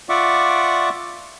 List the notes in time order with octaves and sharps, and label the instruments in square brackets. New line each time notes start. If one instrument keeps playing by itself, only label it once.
[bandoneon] F4 D5 E5 F#5 C#6 D6